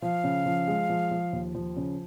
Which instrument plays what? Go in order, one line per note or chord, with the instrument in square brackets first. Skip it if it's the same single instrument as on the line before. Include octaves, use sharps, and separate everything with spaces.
[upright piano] F3 [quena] F5
[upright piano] C#3
F3
G#3
F3
F3
D#2
F3
C#3